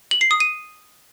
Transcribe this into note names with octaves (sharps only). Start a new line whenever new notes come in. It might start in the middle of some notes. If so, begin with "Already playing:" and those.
F#7
C7
D#6
D#7